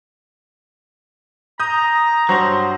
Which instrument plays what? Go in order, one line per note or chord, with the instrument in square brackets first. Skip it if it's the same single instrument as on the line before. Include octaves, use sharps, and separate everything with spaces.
[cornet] A#5 [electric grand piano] D#6 G6
[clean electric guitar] G2 F#3 [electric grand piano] C5 C6